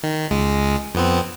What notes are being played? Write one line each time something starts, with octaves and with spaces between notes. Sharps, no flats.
D#3
C#2 G#3
F2 B3 C4